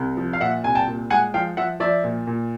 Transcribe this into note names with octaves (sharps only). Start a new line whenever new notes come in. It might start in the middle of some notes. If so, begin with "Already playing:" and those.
Already playing: C2
F3
F5
A#2 E5 F#5
C2 G#5
G5 A5
A#2
G#3 F#5 G#5
F3 F5 G5
F3 E5 F#5
F3 D5 E5
A#2
A#2